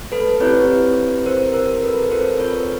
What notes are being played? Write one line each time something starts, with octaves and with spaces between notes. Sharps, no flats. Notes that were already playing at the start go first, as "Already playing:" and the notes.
Already playing: A3 F4
A4 B4
C4 E4 G4 B4 C#5
A#4 C5
A#4 C5
A#4
A4 B4
C4 F4 A4 A#4 C5
B4 C#5